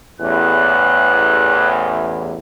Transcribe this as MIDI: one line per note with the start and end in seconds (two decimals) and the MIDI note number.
0.21 2.38 33
0.21 2.38 40
0.21 1.73 90